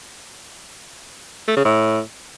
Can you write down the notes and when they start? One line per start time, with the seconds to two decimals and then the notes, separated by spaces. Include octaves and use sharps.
1.48 A3
1.57 C#3
1.65 A2